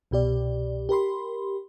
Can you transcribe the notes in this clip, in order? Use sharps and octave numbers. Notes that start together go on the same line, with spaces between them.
C2 B2 G4 D5
G4 A#4 B5 C6